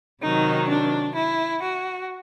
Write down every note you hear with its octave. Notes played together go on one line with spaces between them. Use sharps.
C3 D#3 F#3 D#4
D4
E4
F#4